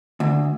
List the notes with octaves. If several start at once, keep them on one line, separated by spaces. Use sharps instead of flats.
D2